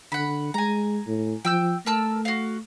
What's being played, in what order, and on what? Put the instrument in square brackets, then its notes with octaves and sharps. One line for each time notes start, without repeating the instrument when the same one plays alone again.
[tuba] D3 [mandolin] F#5 B5
[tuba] G#3 [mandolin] G#5 A#5
[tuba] A2
[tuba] F3 [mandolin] G5 E6 G6
[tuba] A3 [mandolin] A#4 A5 E6
[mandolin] F#4 F5